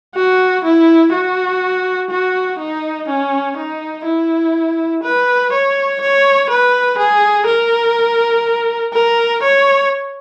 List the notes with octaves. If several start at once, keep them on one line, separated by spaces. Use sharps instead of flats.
F#4
E4
F#4
F#4
D#4
C#4
D#4
E4
B4
C#5
C#5
B4
G#4
A#4
A#4
C#5